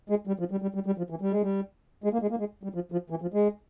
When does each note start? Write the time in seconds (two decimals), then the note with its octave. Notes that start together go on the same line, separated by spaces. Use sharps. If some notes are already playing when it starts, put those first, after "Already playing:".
0.10 G#3
0.27 G3
0.39 F3
0.51 G3
0.62 G3
0.75 G3
0.86 G3
0.98 F3
1.10 E3
1.22 G3
1.31 G#3
1.42 G3
2.04 G#3
2.13 A#3
2.22 G#3
2.31 A#3
2.39 G#3
2.63 G3
2.74 F3
2.92 F3
3.10 E3
3.22 F3
3.34 G#3